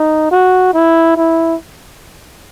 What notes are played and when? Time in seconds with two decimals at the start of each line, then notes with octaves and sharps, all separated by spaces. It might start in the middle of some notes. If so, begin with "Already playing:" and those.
Already playing: D#4
0.31 F#4
0.73 E4
1.17 E4